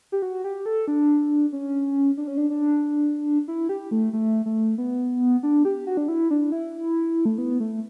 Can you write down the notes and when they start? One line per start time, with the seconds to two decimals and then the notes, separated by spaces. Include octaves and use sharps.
0.12 G4
0.22 F#4
0.44 G4
0.66 A4
0.88 D4
1.53 C#4
2.17 D4
2.28 C#4
2.37 D4
2.50 D4
3.48 E4
3.69 G4
3.91 A3
4.13 A3
4.46 A3
4.78 B3
5.43 D4
5.65 G4
5.87 F#4
5.97 D4
6.08 E4
6.31 D4
6.52 E4
7.25 A3
7.38 B3
7.60 A3